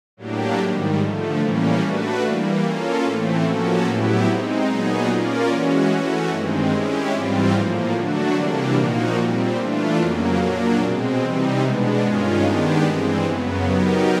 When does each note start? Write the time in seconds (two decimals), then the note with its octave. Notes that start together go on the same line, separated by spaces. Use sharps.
0.17 A2 F#3 A#3 D4 G4
0.58 G#2 D#3 G3
0.98 D3 F3 A3
1.39 A2 E3 G3 A#3 C#4
1.80 A3 D4 F#4 B4
2.21 E3 G3 A#3
2.62 A#3 C#4 F4 A4
3.03 A2 E3 A3 C4
3.44 F3 A#3 C#4 F#4 A4
3.84 A2 F#3 B3 E4 G4
4.25 G#3 C4 D#4
4.67 A#2 F#3 B3 D#4 G#4
5.07 A#3 C#4 F4 A#4 D5
5.48 E3 G#3 C#4 F#4
5.89 E3 A3 C#4 F#4
6.30 G2 D#3 G#3 C4
6.70 G#3 C#4 E4 G4
7.11 G#2 E3 G3 C4 F4
7.52 A2 F3 A#3
7.93 D3 F#3 A3 D4 F#4
8.34 C3 E3 G3 A#3 D4
8.75 A#2 F3 A#3 D#4 F#4
9.16 A#2 G3 C4
9.57 E3 A3 D4 F4
9.97 F2 C#3 F#3 A#3
10.38 A#2 F#3 A#3 D4
10.79 B2 G#3 C4
11.20 C3 E3 G3 C4 D#4
11.61 B2 G#3 B3 D4
12.02 G2 D#3 G#3 C#4 F4
12.42 D#3 G#3 B3 D4 G4
12.84 G2 E3 G#3 C4
13.24 F#2 C#3 F#3 B3
13.65 F#3 B3 D#4 G4 A#4